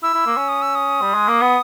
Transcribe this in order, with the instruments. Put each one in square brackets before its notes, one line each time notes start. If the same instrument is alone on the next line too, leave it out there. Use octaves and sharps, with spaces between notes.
[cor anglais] E4 [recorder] E6
[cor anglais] E4
A#3
C#4
[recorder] D#6
E6
D#6
[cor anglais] G3
G#3
A#3
B3